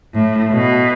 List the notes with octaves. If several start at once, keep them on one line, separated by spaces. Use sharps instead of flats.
A2
B2